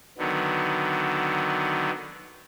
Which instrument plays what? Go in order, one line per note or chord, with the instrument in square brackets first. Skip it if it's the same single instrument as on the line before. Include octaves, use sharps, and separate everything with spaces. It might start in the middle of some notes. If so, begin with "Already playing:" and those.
[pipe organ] D3 D#3 F#3 B3